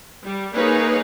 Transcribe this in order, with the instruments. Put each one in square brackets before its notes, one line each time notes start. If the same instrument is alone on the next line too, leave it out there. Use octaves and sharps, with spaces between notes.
[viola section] G3
A#3 D#4 G#4 B4 C#5